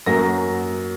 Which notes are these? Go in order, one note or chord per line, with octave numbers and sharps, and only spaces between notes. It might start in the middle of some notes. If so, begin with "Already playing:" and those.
F#2 F#3 A#3 A#6